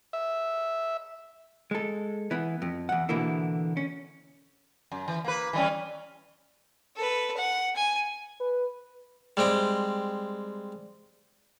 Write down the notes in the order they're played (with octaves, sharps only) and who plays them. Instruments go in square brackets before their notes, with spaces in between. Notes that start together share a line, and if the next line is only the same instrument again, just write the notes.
[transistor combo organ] E5
[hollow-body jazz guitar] G#3 A4
E3 B3
F2
E2 F#5
B2 D3 E3 A#3 E4
C#4
[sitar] F#2
E3
A#3 B4
E3 G3 C#4
[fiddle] A4 B4
F#5
G#5
[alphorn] B4
[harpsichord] G3 G#3 C4 G5